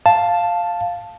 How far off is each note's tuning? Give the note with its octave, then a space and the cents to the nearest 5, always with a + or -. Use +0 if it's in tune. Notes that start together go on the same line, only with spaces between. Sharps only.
F5 +0 A5 +0